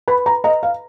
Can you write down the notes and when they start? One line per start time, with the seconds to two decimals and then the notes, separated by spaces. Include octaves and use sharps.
0.08 B4 B5
0.26 A#5
0.44 D#5 A#5
0.63 F5